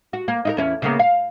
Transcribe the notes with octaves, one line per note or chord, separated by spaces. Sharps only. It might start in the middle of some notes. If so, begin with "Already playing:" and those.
F#4
A#3
D#4 E4 A#4
E2 C#4 E4
C#3 A#3 B3
F5